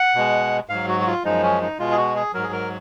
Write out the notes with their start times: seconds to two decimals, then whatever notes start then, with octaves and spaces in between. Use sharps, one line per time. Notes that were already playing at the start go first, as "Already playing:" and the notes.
Already playing: F#5
0.16 B2 G#3
0.69 G#2 F#3 F5
0.88 F#4
1.01 F#4
1.07 F4
1.24 F#2 F3 G#3 D#4
1.43 C#4
1.62 D#4
1.79 B2 G#3 F4
1.91 G#4
1.97 F#4
2.15 G#4
2.34 G#2 F#3 A#4
2.43 G#4
2.52 A#4